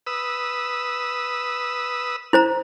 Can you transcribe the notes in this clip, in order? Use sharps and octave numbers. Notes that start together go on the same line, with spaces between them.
B4 D#6 E6
E4 C5 A#5